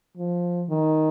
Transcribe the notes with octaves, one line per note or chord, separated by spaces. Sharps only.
F3
D#3